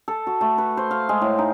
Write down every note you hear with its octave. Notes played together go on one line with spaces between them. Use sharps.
A4
F#4
A3
B4
C5
F5
G#3
A2
D#4